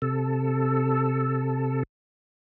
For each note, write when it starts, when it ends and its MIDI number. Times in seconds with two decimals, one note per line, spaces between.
0.02 1.83 48
0.02 1.83 69